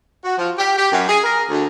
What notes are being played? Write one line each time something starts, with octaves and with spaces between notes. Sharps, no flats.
F#4
F3
G4
G4
F#2
G#4
A#4
D2